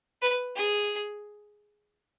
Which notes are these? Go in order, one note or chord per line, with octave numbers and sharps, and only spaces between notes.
B4
G#4